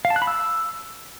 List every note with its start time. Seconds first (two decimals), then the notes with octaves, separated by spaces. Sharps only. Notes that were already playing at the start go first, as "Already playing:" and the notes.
0.05 F5
0.10 A5
0.16 F#6
0.22 B5
0.27 E6